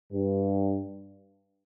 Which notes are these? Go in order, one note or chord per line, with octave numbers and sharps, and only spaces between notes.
G2